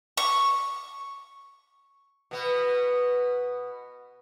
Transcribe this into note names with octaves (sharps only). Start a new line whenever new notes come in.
C#6
B2 B3